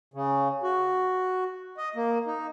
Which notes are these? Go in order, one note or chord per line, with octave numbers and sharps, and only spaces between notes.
C#3
F#4
D#5
A#3
D#4